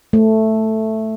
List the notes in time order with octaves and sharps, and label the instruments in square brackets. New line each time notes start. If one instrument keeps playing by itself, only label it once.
[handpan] A3